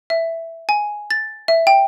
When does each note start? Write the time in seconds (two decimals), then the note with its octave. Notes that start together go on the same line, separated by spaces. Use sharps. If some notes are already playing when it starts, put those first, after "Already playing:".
0.10 E5
0.69 G#5
1.11 A6
1.48 E5
1.67 G5